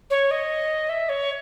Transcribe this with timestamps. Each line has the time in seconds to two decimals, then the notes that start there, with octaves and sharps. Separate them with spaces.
0.10 C#5
0.31 D#5
0.89 E5
1.09 C#5